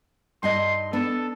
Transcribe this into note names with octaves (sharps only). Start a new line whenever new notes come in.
G2 D#4 D#5 C6
B3 D4 A4